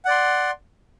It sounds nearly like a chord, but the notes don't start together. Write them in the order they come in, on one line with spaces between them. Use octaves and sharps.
F#5 D5 C6